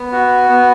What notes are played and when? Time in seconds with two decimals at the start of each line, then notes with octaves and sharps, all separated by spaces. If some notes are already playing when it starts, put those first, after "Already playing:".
Already playing: B3
0.12 F#4
0.49 B3